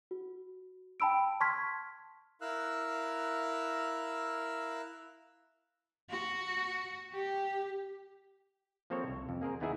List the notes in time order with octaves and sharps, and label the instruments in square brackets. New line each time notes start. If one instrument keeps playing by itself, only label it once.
[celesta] F#4
G5 A5 B5 E6 D7
A5 C6 C#6 F6 G#6 B6
[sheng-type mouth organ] E4 A#4 F5 E6 F#6
[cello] F#4
G4
[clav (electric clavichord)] F3 A#3 C4 A4 C5 C#5
C2
F2
A#3 G#4 A#4 C5
D#2 B3 D#4 E4 G#4 E5